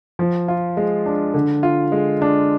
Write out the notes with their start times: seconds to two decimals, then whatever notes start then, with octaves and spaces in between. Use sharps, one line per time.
0.19 F3
0.48 F4
0.77 G#3
1.06 D4
1.34 D3
1.63 F4
1.92 G#3
2.22 D4